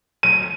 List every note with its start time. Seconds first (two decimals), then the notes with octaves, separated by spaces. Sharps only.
0.23 D#7